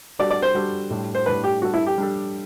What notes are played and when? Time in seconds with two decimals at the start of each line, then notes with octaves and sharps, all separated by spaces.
0.19 G3 D4 F#4 A4 D5
0.31 D5
0.42 C5
0.55 G3 D4 F#4 A4
0.90 A2 G3 D4
1.15 C5
1.26 A2 G3 D4 B4
1.44 G4
1.62 G3 D4 F#4 A4
1.74 E4
1.86 G4
1.98 G3 D4 A4